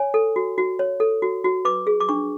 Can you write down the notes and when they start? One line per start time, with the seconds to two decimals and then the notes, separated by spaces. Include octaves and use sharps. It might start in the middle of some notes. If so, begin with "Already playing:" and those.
Already playing: C#5 G#5
0.14 A4
0.36 F#4
0.58 F#4
0.79 C#5
1.00 A4
1.22 F#4
1.44 F#4
1.65 B4 D6
1.87 G#4
2.00 D6
2.09 D4 C#6